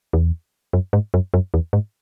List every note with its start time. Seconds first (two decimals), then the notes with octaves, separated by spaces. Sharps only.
0.13 E2
0.73 F#2
0.93 G#2
1.14 F#2
1.34 F#2
1.54 E2
1.73 G#2